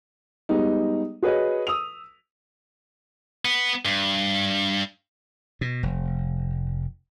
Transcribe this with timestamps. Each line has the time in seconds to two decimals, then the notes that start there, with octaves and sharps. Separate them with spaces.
0.49 G3 G#3 B3 D#4
1.22 F#4 G#4 B4 C#5 D#5
1.67 D#6 E6 F7
3.45 B3
3.85 G2
5.61 B2
5.83 F1